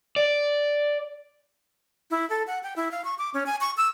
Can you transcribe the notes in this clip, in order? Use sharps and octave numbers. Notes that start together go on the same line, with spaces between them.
D5
E4
A4
F#5
G5
E4
F5
C#6
D6
C#4
G#5
C#6
E6